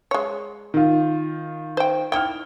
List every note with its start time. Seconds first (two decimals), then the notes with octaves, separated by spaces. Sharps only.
0.11 G#3 C#5
0.74 D#3 F4
1.77 C5 G5
2.12 D#4 E4 G5 F6 G7